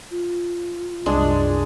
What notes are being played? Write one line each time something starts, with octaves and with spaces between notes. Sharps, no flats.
F4
C2 F#2 G#3 D4